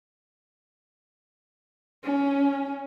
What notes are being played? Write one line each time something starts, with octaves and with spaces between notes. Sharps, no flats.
C#4